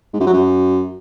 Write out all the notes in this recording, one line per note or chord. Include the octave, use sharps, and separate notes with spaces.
G#2
F#2
F#3
F#2